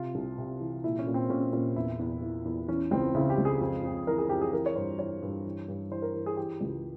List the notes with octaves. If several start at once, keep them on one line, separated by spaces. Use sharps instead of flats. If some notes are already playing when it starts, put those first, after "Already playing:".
Already playing: C3 F4
C2
C3
E3
A#2 E4
C#4
A#2
C4
A#2 C#4
A#2 C#4
E2 E4
E2
E3
E2
E3 C#4
C#2 C4
C#3 E4
G4
C#2
G#4
F2
F2
E3 A#4
G#4
F2 G4
G#4
E3 A#4
C#5
G2 C5
E3 C#5
G2
E3
G2
E3 C5
A#4
E3
G#4
E3 G4
C#2